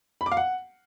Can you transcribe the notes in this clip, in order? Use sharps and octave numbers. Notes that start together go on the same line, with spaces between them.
B5
D6
F5
F#5